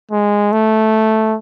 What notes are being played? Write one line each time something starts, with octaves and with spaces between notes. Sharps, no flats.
G#3
A3